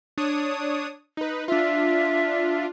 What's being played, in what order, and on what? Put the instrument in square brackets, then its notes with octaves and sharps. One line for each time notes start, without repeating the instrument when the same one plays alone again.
[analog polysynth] D4 C#5 D#6
D#4 B4
[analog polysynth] D4 F4 [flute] E5